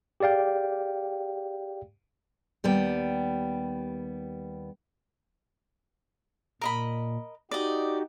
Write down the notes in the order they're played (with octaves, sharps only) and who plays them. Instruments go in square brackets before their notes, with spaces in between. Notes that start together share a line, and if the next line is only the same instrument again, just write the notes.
[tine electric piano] G4 G#4 D5 F5 G5
[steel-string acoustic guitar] D#2 G3 B3 G5
[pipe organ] A#2 [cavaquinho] A#4 D#5 B5
[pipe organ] D#4 F#4 G4 [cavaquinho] D5 D#5